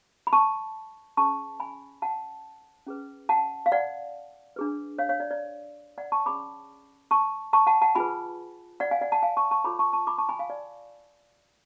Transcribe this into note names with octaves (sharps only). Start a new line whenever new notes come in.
B5
A5 C#6
C#4 G#4 B4 A5 C#6
G#5 B5
F#5 A5
C#4 G#4 B4
F#5 A5
F5
D5 F#5
D4 G#4 B4
C#5 F5
C#5 F5
D5
D5
D5 F#5
A5 C#6
C#4 G#4 C#5 B5 D6
A5 C#6
A5 C#6
F#5 A5
F#5 A5
F4 G#4 B4 G#5 B5
D5 F#5
F5 G#5
D5 F#5
F#5 A5
F5 G#5
A5 C#6
A5 C#6
F4 A4 C#5 B5 D6
A5 C#6
A5 C#6
B5 D6
A5 C#6
G#5 B5
F5 G#5
D5